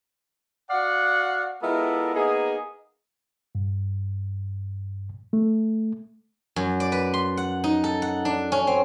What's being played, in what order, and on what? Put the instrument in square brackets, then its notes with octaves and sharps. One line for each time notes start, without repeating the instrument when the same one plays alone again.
[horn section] F#4 D5 F5 F#5
G#3 B3 E4 F4 A4 A#4
A#3 B3 D#4 G#4
[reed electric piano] G2
A3
[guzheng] F#2
D5
B4
C6
F#5
D#4
A4
F#5
D4
C#4
C4